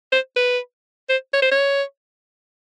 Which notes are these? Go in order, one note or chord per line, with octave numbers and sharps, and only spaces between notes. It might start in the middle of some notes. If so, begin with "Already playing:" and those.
C5
B4
C5
C#5
C5
C#5